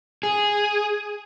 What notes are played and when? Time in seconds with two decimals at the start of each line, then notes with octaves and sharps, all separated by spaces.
0.23 G#4